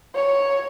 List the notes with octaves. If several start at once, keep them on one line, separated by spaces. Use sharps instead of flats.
C#5